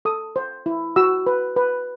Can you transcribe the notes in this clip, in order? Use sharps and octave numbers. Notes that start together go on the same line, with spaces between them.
A4 D#6
C5
E4
F#4 E6
B4
B4